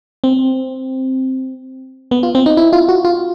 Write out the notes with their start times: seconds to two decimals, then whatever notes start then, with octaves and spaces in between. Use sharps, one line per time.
0.24 C4
2.11 B3
2.23 F4
2.35 C4
2.46 D#4
2.57 E4
2.73 F4
2.89 F#4
3.05 F4